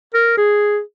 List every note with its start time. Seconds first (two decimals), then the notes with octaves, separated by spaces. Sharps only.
0.14 A#4
0.37 G#4